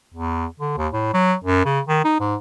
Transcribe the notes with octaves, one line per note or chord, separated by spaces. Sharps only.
E2
D3
D#2
A2
F#3
F#2
C#3
D#3
D#4
G#2